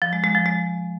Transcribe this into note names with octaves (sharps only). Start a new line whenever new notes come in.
F3
G#3
G#3
F3
G#3